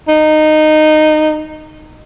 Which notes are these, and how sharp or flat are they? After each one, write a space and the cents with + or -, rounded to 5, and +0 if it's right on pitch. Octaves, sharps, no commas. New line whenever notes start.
D#4 -15